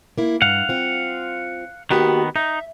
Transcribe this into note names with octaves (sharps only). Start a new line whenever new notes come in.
A#3 E4
G2 F5 F#5
C4 F4
D#3 A#3 B3 F#4 G4
D#4 E5